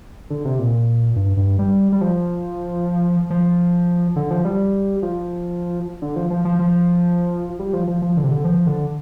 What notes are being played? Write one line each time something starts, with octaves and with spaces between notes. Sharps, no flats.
D3
C3
A#2
G2
G2
G3
G3
F3
F3
D3
F3
G3
F3
D3
F3
F3
F3
F3
G3
F3
F3
F3
D3
C3
D3
F3
D3